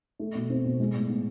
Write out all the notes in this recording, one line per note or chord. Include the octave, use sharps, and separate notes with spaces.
A3
B2
C4
B2
G#3
A2
B3